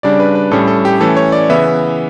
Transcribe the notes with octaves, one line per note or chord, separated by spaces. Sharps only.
C#3 G3 D4 D5
B4
B4
A2 G3 C#4 A4
A4
G4
E3 A3 C#4 A4
C#5
D5
C#3 E3 B3 E5